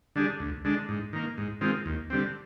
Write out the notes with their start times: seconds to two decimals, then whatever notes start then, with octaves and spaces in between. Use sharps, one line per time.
0.16 D3 G3 D4 G#4
0.40 D2
0.65 D3 G#3 D4
0.89 G#2
1.13 D#3 A#3
1.38 G#2
1.61 D#3 G#3 C4 F4
1.86 D#2
2.10 D3 G3 C4